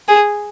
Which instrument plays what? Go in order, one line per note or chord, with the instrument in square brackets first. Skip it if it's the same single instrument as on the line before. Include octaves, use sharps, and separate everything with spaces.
[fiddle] G#4